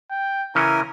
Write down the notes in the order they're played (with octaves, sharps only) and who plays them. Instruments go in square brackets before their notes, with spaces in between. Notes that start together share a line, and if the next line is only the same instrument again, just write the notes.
[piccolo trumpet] G5
[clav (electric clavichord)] C#3 E3 C#4 [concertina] E4 A#4 G#5 [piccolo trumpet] A#5